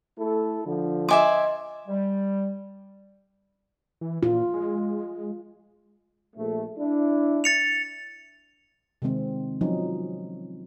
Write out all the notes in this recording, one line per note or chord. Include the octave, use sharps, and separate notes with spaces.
A3 E4 A4
D3 F3
D#5 E5 G#5 C6 D6
G3
E3
A#2 F4
G#3
A#1 A3
D4 E4
A6 C#7 F7
C3 D#3 G#3 C4
F3 F#3 C#4 D#4